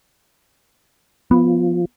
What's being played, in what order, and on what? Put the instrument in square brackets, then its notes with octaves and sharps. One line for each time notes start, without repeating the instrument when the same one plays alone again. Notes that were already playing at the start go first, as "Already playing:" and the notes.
[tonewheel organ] F3 [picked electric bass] B3